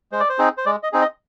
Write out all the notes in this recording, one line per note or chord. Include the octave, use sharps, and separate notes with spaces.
G#3 C5
D5
C5
C4 D#4 G#4
C5
G#3 D5
D#5
C4 D#4 G#4
D#5